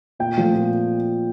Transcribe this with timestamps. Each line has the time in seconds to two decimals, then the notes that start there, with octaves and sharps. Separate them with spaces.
0.19 A#2 G5
0.38 F3 A3
0.55 A#2